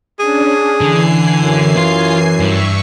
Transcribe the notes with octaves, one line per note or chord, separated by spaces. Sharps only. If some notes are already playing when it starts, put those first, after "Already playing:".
C#4 D4 G#4
D3 E3 G#5 C7
F#2
F4
G2 E5 C#6